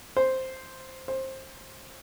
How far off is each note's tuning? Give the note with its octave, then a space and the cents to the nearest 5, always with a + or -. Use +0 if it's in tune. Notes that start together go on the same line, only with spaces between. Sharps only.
C5 +0
C5 +20